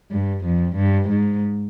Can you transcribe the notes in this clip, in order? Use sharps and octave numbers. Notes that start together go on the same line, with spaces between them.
G2
F2
G2
G#2